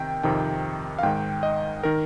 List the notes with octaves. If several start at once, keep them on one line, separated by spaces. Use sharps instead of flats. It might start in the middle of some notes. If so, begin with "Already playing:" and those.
Already playing: C3 D#3 G5
F2 C3 D#3 G5
F5
G#2 D#3 G5
D#5
D#3 A#4